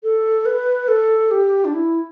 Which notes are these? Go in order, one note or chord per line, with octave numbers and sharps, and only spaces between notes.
A4
B4
A4
G4
D4
E4